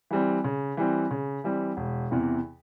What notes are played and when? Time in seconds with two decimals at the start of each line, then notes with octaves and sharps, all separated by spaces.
0.11 E3 G3 C4
0.44 C#3
0.77 E3 G3 C4
1.11 C#3
1.44 E3 G3 C4
1.77 E1
2.11 E2 C3 E3